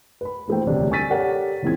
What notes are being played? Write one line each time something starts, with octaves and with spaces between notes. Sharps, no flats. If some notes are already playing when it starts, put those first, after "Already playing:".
B4 B5
A#1 E3 A3 A#3 C5 G5
E1 D2 C3 G3 D4
G#5 C#6 E6 A6 B6 D#7
G4 A4 A#4 C#5 D5 F#5
C#2 A#2 E3 C4 G#4 G#6